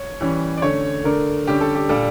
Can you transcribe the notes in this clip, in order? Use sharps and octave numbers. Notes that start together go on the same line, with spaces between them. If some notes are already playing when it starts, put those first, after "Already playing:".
Already playing: C#5
E3 G3 C#4
D5
D3 A3 C#4 C#5
D3 A3 D4 A#4
D3 G3 C#4 G4
A4
G4
A#2 G3 D4 A4